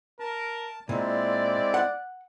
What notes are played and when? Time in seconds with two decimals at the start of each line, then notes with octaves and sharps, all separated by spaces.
0.20 A#4 A5
0.89 A#2 G#3 C4 E4 D5
1.74 F#5